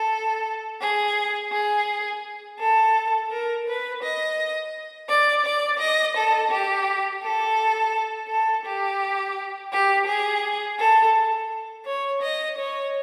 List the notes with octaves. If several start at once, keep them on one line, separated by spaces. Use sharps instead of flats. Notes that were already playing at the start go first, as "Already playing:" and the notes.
Already playing: A4
G#4
G#4
A4
A#4
B4
D#5
D5
D5
D#5
A4
G4
A4
A4
G4
G4
G#4
A4
C#5
D#5
C#5